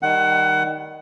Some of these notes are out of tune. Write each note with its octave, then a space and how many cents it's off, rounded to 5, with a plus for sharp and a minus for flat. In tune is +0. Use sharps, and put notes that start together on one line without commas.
D#3 +0 G3 +0 F#5 +20